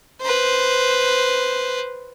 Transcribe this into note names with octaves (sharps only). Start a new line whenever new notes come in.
B4 C5